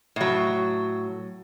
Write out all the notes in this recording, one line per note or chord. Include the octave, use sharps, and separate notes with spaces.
A2 F#3